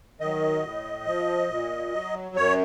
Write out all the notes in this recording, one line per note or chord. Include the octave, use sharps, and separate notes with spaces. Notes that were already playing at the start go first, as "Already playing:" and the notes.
D#3 F#3 D#5
A2
F3
A#2
F#3
F#2 C#5